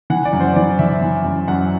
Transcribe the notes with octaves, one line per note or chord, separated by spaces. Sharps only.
E3 F#5
D5
F#2
C5
E3 D5
E3 E5
E3
F#2
F#2 F#5